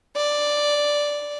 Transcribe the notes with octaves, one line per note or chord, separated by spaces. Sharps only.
D5